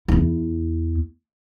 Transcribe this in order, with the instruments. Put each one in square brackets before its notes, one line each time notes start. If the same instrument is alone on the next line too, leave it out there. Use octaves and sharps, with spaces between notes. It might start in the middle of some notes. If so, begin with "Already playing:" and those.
[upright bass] E2 E4